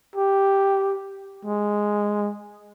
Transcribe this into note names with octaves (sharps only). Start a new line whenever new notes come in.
G4
G#3